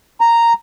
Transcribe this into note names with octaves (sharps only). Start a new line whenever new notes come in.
A#5